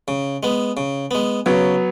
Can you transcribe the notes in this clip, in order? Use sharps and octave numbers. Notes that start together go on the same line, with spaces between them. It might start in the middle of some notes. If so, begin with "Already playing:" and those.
C#3
G#3 B3
C#3
G#3 B3
C#3 F#3 B3